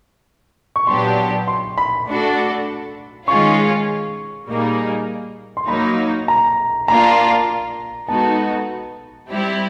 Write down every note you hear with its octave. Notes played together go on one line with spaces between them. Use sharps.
C#6
A#2 F#3 B3 D4 G4 C6
C6
B5
A3 D4 F#4 A4
D#3 G#3 C#4 F4 C#6
A#2 G3 A#3 D#4 G#4
C6
F#3 A#3 D#4 B5
A#5
A#3 D4 F4 A#5
G#3 B3 D#4 F#4 A4 A5
G3 C4 E4 G4